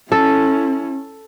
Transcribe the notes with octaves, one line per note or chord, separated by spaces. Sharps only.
C#4 E4 A4